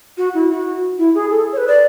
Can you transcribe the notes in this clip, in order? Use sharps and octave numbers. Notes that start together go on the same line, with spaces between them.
F#4
E4
F#4
E4
G#4
A4
C#5
B4
D5